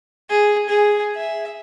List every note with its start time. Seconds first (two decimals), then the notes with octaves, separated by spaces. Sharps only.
0.30 G#4
0.69 G#4
1.16 E5